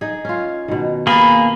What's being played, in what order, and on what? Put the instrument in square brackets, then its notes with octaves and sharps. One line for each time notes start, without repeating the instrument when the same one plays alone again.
[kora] D#4 G#4
C#4 F4
B2 D#3
[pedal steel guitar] A#3 G#4 [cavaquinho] B4 A5 B5